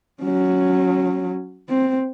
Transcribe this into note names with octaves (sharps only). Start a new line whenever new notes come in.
F#3 C#4
C4